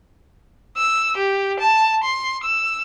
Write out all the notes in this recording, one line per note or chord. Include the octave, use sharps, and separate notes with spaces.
E6
G4
A5
C6
E6